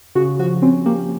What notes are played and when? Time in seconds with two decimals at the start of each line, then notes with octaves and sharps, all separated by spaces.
0.15 C#3 F#4
0.39 F3 F#4
0.62 C4 C#4
0.86 A#3 G4